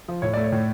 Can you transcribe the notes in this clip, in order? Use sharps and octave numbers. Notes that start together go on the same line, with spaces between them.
F3
A2 C#5
A3 D5
C#5
A2